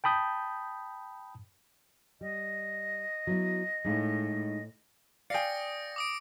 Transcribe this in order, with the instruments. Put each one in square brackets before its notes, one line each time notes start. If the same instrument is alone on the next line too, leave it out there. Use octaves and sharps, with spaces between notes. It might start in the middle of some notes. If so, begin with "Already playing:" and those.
[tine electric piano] G5 A5 B5 D#6 G6
[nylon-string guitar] G3 [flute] D#5
[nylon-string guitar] F#3 B3 E4
[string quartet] A2 [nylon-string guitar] G#3 D#4 F5
[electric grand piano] D5 G5 [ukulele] F5 G#5 [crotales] D#6 A#6 C#7
[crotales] D6 D#6 D7